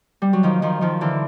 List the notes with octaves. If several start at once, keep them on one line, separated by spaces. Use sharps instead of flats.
G3
F#3
D#3 F3
D#3 F3
D#3 F3
D3 E3